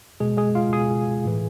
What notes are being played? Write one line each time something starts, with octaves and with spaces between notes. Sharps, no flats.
B2 G#3 G#4
G#3 G#4
F4 F5
B2 G#4 G#5
A2 E3